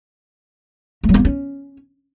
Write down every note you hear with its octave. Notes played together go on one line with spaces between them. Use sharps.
A3
F#3
A#3
F#3
C#4